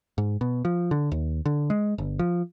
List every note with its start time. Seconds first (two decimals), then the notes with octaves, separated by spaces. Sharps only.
0.18 G#2
0.41 B2
0.65 F3
0.91 D3
1.12 D#2
1.46 D3
1.70 G#3
1.98 G1
2.19 F3